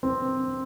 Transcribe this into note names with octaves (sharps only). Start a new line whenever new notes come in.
C4